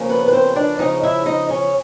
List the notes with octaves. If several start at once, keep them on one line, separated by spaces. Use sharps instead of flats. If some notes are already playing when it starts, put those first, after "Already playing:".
Already playing: E2 C#3 F3 A#3 C#4
B3 B4
B4
C4 C5
D4 D5
E2 C#3 F3 C#4 D#4 D#5
E4 E5
D#4 D#5
C#4 C#5